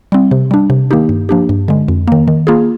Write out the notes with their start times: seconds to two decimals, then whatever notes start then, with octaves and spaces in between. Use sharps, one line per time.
0.12 G3 C4
0.31 C3
0.51 G3 D4
0.70 C3
0.91 D#3 A#3 D#4 G4
1.09 G2
1.29 F3 A#3 D4 G4
1.49 G2
1.68 D3 G#3
1.88 F2
2.08 D#3 A#3
2.28 D#3
2.47 A#3 F4 G#4